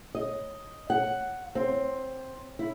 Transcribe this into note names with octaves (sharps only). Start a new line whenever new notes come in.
D#5
F#5
C4
E4